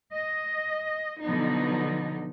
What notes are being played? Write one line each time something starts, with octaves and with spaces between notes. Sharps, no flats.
D#5
B2 D3 F3 F#3 B3 D#4